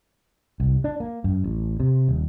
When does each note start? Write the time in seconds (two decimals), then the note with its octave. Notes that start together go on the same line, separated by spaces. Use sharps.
0.60 C2
0.84 D4
1.00 A#3
1.24 F#2
1.44 A1
1.80 C3
2.09 D#1